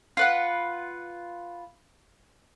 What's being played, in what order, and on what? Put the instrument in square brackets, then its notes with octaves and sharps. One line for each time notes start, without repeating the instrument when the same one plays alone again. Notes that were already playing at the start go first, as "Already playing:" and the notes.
[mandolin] F4 B4 F#5